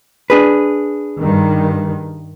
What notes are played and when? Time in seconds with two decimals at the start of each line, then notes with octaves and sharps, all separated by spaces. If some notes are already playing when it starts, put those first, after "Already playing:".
0.30 D4 G#4 B4
1.20 G2 D#3